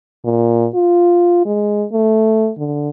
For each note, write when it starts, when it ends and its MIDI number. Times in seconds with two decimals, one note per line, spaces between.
0.25 0.67 46
0.75 1.41 65
1.45 1.85 56
1.92 2.51 57
2.58 2.89 50